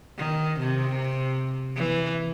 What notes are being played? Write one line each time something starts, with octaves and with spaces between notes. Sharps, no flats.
D#3
C3
E3